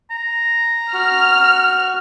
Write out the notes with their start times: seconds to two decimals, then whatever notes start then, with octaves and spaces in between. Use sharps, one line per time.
0.11 A#5
0.93 F#4 F6